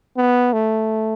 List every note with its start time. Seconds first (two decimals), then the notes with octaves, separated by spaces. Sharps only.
0.17 B3
0.53 A3